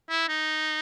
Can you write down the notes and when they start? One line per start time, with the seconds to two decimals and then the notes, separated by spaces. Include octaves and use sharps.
0.09 E4
0.29 D#4